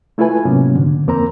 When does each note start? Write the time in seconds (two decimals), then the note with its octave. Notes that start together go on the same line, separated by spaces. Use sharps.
0.18 A3 E4 F4 A4 B4 G#5
0.45 G#2 C3 F#3 A#3 B3 C#4
0.76 D3
1.07 F2 A#3 C4 A#4 C5 A#5